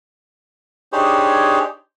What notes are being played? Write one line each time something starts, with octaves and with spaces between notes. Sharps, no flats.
D4 D#4 G4 G#4 C5 C#5